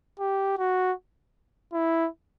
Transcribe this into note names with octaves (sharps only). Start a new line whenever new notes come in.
G4
F#4
E4